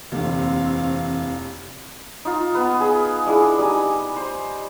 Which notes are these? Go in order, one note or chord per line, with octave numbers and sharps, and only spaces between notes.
F1 D#2 D3 E3 C4 F5
D#4 F4
B3 B4
G#4 B5
G#3 D4 E4 G#4
G3 D#4 G#5
C5